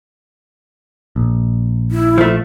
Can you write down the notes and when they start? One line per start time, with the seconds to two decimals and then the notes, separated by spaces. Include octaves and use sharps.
1.16 A#1
1.91 E4
2.18 F3 A3